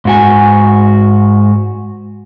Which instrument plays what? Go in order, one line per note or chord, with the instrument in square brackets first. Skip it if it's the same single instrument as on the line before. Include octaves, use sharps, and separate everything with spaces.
[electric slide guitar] G#2 F#4 G#5